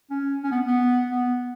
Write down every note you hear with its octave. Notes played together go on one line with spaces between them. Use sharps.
C#4
C#4
B3
B3
B3